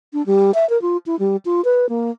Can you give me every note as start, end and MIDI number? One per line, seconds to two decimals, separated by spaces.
0.13 0.25 62
0.26 0.54 55
0.54 0.68 76
0.70 0.80 70
0.82 0.97 65
1.06 1.18 64
1.19 1.37 55
1.45 1.63 65
1.65 1.89 71
1.89 2.11 58